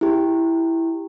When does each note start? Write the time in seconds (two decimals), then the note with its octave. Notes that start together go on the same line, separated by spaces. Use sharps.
0.01 E4 G4